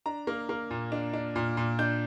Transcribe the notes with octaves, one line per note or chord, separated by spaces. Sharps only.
D4 A#5
A#3
A#3
A#2
D4
D4
A#2
A#2
D4 G6